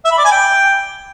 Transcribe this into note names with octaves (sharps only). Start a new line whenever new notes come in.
E5
B5
D5
G#5
G5